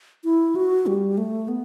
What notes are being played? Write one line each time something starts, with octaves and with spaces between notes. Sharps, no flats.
E4
F#4
G3
A3
B3